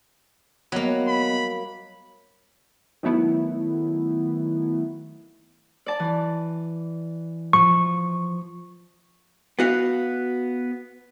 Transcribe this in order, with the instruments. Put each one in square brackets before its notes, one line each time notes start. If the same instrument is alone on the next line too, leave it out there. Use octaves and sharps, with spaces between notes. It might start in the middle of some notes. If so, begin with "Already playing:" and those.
[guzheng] F#3 A#3 [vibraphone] G3 B3 D#5
[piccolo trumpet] B5
[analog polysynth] D#3 F#3 A3 B3 E4
[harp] D5 A5 D6
E3
[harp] F3 [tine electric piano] C#6
[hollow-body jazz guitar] B3 F#4 F5